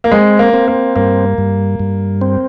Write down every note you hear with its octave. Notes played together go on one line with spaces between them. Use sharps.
A#3
G#3 C4
A#3
C4
A#3
G2 A#3
G2
G2
C4